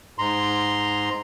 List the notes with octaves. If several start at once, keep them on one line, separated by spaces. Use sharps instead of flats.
G#2 A#5 C6